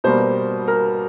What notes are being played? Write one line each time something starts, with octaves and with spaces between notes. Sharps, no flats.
B2 G3 A#3 C5
A#4